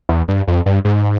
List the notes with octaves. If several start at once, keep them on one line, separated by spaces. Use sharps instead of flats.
E2
G2
F2
G2
G#2